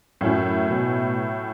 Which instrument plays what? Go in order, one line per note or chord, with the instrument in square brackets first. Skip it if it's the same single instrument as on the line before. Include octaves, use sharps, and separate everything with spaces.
[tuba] F#2 [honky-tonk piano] A2 F#3 C#4 E4
[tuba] B2